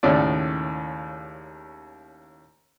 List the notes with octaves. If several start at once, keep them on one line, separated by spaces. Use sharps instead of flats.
D#2 A2 C#3 C#4 D5